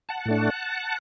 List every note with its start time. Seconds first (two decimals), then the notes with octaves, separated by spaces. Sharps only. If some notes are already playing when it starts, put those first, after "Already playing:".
0.09 F#5 A5
0.26 A2 A3 D4